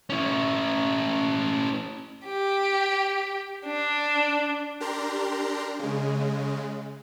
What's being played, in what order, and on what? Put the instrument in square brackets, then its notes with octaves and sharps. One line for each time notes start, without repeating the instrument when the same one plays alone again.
[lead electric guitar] C#4 E4
[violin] G4
D4
[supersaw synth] D4 G4 A#4 A#5 C6
C#3 G#3